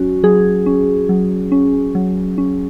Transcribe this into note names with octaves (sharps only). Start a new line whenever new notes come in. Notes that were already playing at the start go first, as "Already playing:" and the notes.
Already playing: F#3 C#4 F#4
F#3 G#4
C#4
F#3
C#4
F#3
C#4